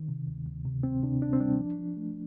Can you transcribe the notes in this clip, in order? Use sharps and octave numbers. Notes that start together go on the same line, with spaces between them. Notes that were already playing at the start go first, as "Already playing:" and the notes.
Already playing: D#3
C3
D2
D2
C3
D2 C4
C3 D4
C3 D4
C4
G3 D4
F3
F3
A3